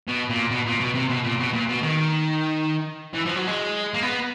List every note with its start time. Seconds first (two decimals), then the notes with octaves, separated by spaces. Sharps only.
0.08 B2
0.29 A#2
0.51 B2
0.66 A#2
0.80 B2
0.95 C3
1.09 B2
1.24 A#2
1.39 B2
1.53 A#2
1.69 B2
1.83 D#3
3.14 E3
3.26 F3
3.36 F#3
3.47 G#3
3.94 A#3
4.03 B3